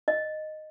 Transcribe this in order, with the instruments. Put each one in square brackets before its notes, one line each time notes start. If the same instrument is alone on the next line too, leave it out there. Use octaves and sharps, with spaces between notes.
[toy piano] D#5